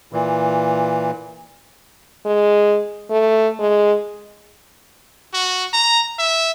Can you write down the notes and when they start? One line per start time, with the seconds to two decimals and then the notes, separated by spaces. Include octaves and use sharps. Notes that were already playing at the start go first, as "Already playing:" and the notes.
0.13 A#2 E3
2.26 G#3
3.10 A3
3.60 G#3
5.33 F#4
5.73 A#5
6.18 E5